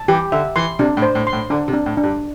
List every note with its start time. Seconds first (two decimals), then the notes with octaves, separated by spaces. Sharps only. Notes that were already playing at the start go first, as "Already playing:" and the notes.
Already playing: A5
0.08 E3 G4
0.32 D3 E5
0.56 E3 C6
0.79 C3 D4
0.97 A2
1.02 C5
1.15 A2
1.27 C6
1.33 A2
1.50 D3 D4
1.68 C3
1.73 D4
1.86 A2
1.97 D4
2.03 G2